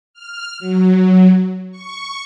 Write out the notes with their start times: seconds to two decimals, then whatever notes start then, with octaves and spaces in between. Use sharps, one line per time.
0.13 F6
0.59 F#3
1.71 C#6